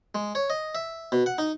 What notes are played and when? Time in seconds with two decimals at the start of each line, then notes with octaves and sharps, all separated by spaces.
0.15 G#3
0.35 C#5
0.50 D#5
0.75 E5
1.12 B2
1.26 F#5
1.38 D#4